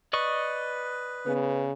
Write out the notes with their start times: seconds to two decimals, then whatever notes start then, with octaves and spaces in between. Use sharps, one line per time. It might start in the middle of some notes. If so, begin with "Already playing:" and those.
0.13 B4 D5 D#5 C#6
1.26 C#3 B3